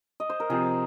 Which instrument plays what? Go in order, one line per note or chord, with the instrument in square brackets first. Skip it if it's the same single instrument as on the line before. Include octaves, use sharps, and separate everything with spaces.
[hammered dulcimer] D#5
C5
A#4
[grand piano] C3 F3 C4 [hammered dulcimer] G#4